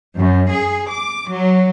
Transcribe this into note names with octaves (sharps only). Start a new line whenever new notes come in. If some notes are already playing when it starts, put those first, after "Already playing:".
F#2
G#4
D6
F#3